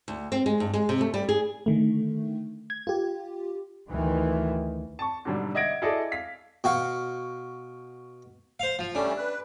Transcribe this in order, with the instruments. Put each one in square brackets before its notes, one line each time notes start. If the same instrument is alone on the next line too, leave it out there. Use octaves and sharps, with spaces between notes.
[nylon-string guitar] D2
C4
G#3
G2
G#3
C3
A3
G3
G#4
[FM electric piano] D3 D#3 A3
G#6
F4 G4
[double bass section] D2 D#3 E3
[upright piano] A5 C#6
G#2 B2 D3 F#3 G3 D4
D#5 E5 F#5 G#6 A#6 D7
E4 F#4 G#4 A4 D5 D#5
F5 B6
[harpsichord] B2 F#4 F5
C5 F5
F3
[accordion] G3 A3 C#4 [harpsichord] D4
[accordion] B4